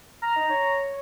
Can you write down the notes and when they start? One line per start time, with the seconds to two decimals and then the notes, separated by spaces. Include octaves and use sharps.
0.22 A#5 F6
0.36 D#4
0.49 C#5